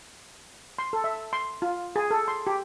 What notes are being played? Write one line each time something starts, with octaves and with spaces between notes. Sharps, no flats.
C6
A4
E5
C6
F4
G#4
A4
C6
G4